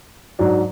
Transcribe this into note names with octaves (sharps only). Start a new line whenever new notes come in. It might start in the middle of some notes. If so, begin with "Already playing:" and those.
G#2 F#3 D4